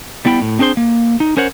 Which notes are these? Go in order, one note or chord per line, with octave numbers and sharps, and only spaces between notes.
G3 B3 E4 G5 B5
A2
C4 D4 G#4 C5 C6
A#3
D#4
C#4 A#4 C5 C#5 F#5